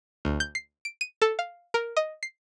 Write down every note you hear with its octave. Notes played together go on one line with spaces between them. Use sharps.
D2
G6
C7
D7
D#7
A4
F5
A#4
D#5
C7